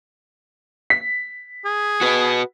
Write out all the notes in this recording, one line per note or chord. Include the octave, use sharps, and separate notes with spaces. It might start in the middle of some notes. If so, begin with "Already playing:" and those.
B6
G#4
F#4 B4